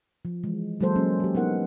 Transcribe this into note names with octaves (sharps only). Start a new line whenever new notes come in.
F3
E3 G#3
E3 F#3 G#3 A#3 A4 C5
F#3 A#3 C#4
F#3 G4
B3 D4 D#4 A#4 F#5